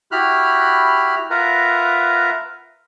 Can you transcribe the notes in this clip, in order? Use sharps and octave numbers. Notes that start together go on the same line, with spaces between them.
E4 F#4 G4 B5 F6 F#6
F4 A#4 B4 E5 F#5 A#5